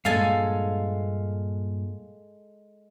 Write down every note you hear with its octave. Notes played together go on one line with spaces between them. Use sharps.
G2 A#2 G#3 A4 F5 G#5